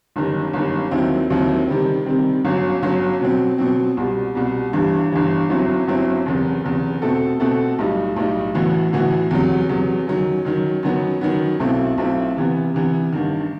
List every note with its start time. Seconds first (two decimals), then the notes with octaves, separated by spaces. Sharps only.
0.16 G1 F#2 D#3 G3
0.53 G1 F#2 D#3 G3
0.91 D#2 D#3 F#3 C4 E4
1.30 D#2 D#3 F#3 C4 E4
1.68 C3 D#3 G3 C4
2.06 C3 D#3 G3 C4
2.45 G1 F#2 F#3
2.82 G1 F#2 F#3
3.21 B2 F#3 C4
3.58 B2 F#3 C4
3.97 C2 B2 G3
4.35 C2 B2 G3
4.73 G1 G2 E3 G3
5.12 G1 G2 E3 G3
5.49 G1 F#2 F#3 C4 E4
5.88 G1 F#2 F#3 C4 E4
6.26 F#1 E2 C3
6.64 F#1 E2 C3
7.02 B2 A3 C4 F#4 A4
7.40 B2 A3 C4 F#4 A4
7.79 B1 A2 G3 D#4
8.16 B1 A2 G3 D#4
8.54 A1 A2 E3 B3 F#4
8.93 A1 A2 E3 B3 F#4
9.31 E2 C3 F#3
9.69 E2 C3 F#3
10.07 F#2 D#3 F#3
10.45 F#2 D#3 F#3
10.83 F#2 D#3 F#3 B3
11.21 F#2 D#3 F#3 B3
11.60 B1 B2 A3 C4 E4
11.98 B1 B2 A3 C4 E4
12.36 C3 E3 B3
12.74 C3 E3 B3
13.12 A1 G2 D#3